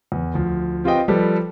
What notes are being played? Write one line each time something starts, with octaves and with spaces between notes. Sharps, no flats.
E2
D2 F3
C4 F4 G4 B4 D#5 G5
F3 G3 G4 A4 B4